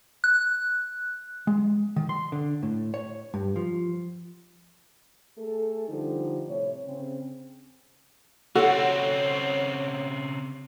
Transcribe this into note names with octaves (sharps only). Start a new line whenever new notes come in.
F#6
G#3
D#3
C6
D3
A2
C#5
G2
F3
A3 G#4 A4
D3 F3 G3 D#4
A2 C3 C#5
C#3 C4
C#3 C4 F#4 A4 C#5 F#5